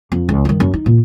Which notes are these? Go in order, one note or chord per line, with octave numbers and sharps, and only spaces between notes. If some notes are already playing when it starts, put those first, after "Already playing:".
F2
C#2
G2 D#3
F#2
D#4
A#2